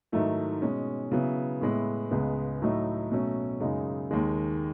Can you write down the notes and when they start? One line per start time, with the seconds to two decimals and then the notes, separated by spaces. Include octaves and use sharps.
0.12 G#2 D#3 F#3 A3 E4
0.62 B2 G#3 C#4
1.12 C#3 F#3 B3 E4
1.61 A2 G#3 B3 E4
2.11 C#2 C#3 G#3 B3
2.62 A2 F#3 A3 D#4
3.11 B2 F#3 A3 C#4
3.60 F#2 C#3 G#3 D#4
4.11 D#2 D#3 G#3